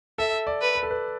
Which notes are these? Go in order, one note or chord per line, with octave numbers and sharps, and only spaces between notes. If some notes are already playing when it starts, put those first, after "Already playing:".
A4 E5
D5
B4
B4
A4
B4